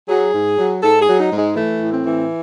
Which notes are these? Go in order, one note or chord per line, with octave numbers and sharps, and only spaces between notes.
F#3 G#4
G#2
F#3
G#2 A4
G#4
F#3
D#4
G#2
G#3
E3 A3
A2
C4
E3